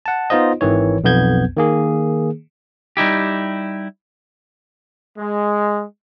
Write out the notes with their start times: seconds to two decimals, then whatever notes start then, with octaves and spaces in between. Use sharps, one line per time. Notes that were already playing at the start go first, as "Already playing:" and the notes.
0.06 F#5 A5
0.30 B3 D#4 F4 C5 D#5
0.61 G#1 D#3 E3 C#5
1.04 B1 F2 B3 G6 G#6
1.57 D#3 A#3 G#4
2.97 G3 D#4 E4 G4
5.18 G#3